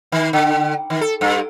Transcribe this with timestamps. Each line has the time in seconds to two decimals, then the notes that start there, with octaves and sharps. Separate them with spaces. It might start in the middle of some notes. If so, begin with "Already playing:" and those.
0.12 D#3
0.33 D3
0.90 D#3
1.01 A4
1.21 G2